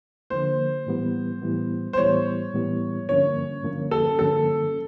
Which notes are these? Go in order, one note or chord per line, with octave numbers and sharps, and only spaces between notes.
D3 F3 A#3 C5
A2 E3 G3 B3
A2 E3 G3 B3
C5
A2 E3 G3 B3 C#5
A2 E3 G3 B3
G2 D3 F3 A#3 C#4 C#5
G2 D3 F3 A#3 C#4
A4
G2 D3 F3 A#3 C#4 A4